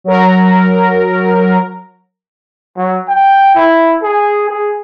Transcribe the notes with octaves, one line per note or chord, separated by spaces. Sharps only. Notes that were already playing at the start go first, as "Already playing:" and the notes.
F#3 A#4
F#3
G5
E4
G#4
G#4